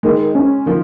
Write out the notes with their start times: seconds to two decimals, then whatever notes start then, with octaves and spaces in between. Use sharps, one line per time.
0.03 D#3 G#3
0.35 C#4
0.66 D#3 F3